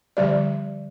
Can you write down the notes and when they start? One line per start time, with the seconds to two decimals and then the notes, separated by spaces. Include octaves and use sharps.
0.17 D3 F3 G3 G4 D5